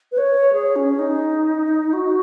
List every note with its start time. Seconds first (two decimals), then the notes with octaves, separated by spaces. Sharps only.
0.12 B4
0.18 C#5
0.53 G#4
0.76 C#4
0.99 D#4
1.93 F#4